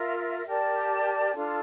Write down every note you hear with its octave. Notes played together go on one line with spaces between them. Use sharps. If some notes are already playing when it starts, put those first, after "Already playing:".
Already playing: F4 A#4 E5
G4 A#4 D5 A5
D4 F4 A4